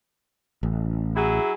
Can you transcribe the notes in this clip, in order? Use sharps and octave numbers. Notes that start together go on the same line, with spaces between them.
A1
F#3 E4 G#4